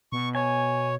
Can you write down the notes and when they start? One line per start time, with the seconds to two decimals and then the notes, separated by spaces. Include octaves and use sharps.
0.12 B2 C#6
0.35 C#5 G#5